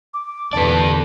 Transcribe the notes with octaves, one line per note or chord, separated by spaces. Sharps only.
D6
E2 A#2 D3 B4 D5 A5